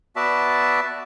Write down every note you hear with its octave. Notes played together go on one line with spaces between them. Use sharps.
B3 F#4 D5 E5 A5